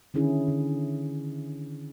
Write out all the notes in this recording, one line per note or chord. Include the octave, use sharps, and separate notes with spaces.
D3 D#3 C#4 E4 G#4
D3